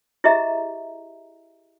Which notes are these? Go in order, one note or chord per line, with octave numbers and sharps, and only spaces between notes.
E4 G4 G#4 D#5 E5 A#5